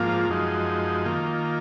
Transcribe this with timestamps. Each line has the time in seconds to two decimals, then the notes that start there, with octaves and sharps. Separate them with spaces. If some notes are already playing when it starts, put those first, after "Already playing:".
Already playing: G#2 F3 A#3 F4
0.29 F#2 F3 G#3 D#4
1.06 D#3 A#3 F4